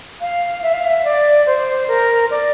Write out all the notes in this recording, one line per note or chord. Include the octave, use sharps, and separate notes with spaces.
F5
E5
F5
E5
D5
C5
A#4
D5